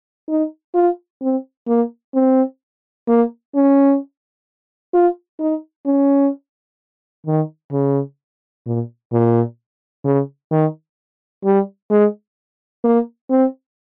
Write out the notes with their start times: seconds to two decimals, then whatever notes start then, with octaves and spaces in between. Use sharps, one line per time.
0.29 D#4
0.75 F4
1.22 C4
1.68 A#3
2.14 C4
3.08 A#3
3.55 C#4
4.94 F4
5.40 D#4
5.86 C#4
7.27 D#3
7.72 C#3
8.66 A#2
9.12 A#2
10.05 C#3
10.51 D#3
11.45 G3
11.91 G#3
12.84 A#3
13.30 C4